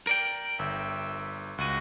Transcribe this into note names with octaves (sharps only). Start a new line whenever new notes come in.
A#4 D5 G5
G1 E5
C#2 F#4 D#7